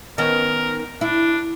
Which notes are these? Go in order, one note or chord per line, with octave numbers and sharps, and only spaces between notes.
D#3 B3 C#4 A#4
D4 E4